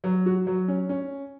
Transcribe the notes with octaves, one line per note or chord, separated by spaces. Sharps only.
F#3
F#4
F#3
C#4
C#4